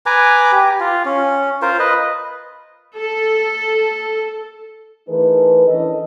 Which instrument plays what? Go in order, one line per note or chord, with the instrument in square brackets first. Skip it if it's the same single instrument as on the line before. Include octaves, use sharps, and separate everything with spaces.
[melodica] B4 G#5 A#5 D6
G4
F4
C#4
F4 A#4 C5
B4 D#5
[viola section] A4
[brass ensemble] E3 A3 D#4 G#4 A#4 B4
E3 C#4 D4 A4 D#5